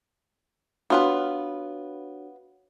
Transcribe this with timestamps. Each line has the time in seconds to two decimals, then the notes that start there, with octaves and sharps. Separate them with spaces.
0.90 B3 D4 F4 F#4 B4 C#5